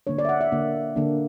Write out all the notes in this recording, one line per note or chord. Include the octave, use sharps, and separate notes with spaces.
D3 A#3 D4 C#5
D5
E5
F#5
E5
D3 A#3 D4
D3 A#3 D4